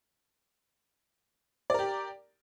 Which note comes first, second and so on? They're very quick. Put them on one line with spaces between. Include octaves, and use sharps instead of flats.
D5 A#4 G4